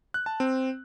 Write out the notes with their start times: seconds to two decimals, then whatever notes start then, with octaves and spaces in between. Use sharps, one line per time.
0.14 F#6
0.26 A5
0.40 C4